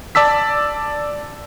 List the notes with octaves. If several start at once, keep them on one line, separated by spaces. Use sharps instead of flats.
D5 A5 E6 B6